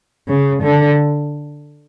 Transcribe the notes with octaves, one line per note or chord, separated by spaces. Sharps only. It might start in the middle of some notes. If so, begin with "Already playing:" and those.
C#3
D3